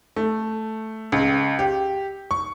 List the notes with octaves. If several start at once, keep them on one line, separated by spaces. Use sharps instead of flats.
A3
C#2
G4
C#6